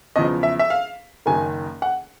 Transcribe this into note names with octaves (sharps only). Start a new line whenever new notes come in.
E2 C#3 F3 D#5
E5
E5
F5
F#1 F#2 D#3 G#5
F#5